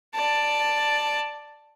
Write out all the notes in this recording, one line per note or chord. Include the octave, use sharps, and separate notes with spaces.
D5 A5